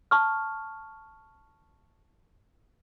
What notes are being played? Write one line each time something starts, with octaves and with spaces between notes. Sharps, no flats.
A5 C#6 F6